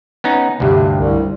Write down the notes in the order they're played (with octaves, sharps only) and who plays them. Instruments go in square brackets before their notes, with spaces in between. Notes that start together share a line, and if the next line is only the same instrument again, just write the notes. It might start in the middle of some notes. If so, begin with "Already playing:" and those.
[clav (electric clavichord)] B3 C#4 D#4
[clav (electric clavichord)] D2 G2 [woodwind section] C3
[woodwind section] C2